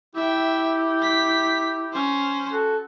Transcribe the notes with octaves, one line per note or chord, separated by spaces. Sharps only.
E4 G4 E5 G5
B6
C#4 C5
F#4 A4